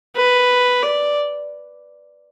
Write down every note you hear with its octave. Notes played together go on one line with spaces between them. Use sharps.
B4
D5